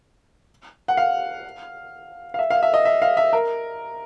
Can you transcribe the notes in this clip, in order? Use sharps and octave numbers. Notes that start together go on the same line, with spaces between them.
F#5
F5
F5
E5
F5
E5
D#5
E5
F5
E5
A#4